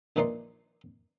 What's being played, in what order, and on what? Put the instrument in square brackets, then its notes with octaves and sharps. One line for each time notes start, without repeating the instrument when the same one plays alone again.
[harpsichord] A#1 D#3 E3 D#4 D5 C6